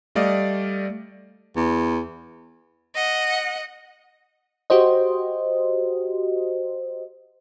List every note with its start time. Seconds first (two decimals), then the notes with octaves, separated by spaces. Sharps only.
0.15 G3 A3 D5 D#5 F5
1.56 E2
2.95 D#5 F#5
4.70 F#4 G4 C5 D#5